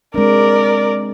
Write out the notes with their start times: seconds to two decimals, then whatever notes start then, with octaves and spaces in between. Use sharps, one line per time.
0.14 G#3 C4 D4 A#4 D5